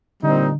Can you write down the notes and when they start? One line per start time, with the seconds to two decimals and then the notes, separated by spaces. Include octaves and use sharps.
0.23 A#2 D3 G3 C4 D#4